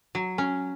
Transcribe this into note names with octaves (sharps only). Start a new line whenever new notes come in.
F#3
C#4